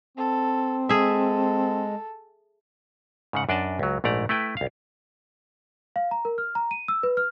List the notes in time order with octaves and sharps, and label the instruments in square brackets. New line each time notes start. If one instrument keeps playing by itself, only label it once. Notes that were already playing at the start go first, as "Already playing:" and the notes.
[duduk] C4 [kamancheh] A4
[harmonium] G#3 [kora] G#4 E5 [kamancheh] A4
[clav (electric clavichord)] G#2 C#3 F#5
F#2 D4 D5 D#5 A5
C#2 F#3
A#1 G#2 A3 D5 A#5
A3 E4 B4 G5
C2 F5
[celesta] F5
A#5
A#4
F6
A#5
D#7
E6
B4
F6